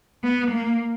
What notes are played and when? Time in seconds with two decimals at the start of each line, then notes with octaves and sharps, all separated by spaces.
0.24 B3
0.51 A#3